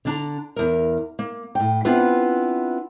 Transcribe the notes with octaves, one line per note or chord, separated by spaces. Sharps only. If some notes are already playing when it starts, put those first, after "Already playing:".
D3 D4 A#5
E2 A#4
A#3
A2 G5
B3 C4 D4 E4 F4 B4